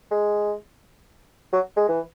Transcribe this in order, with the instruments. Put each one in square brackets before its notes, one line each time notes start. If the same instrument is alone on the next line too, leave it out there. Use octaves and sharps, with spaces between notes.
[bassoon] G#3
F#3
G#3
E3